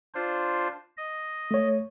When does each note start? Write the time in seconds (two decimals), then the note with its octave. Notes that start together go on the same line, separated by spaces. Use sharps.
0.15 D4 F4 C5
0.97 D#5
1.51 A3 C#5